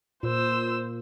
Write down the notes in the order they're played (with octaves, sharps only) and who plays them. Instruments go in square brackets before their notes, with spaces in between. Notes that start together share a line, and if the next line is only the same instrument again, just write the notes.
[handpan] A#2 [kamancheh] C5 E6